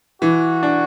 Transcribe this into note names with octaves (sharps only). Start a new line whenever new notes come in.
E3 F#4
D4